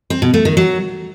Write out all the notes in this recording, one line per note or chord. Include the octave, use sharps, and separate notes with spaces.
C4
B2
A3
D#3
F#3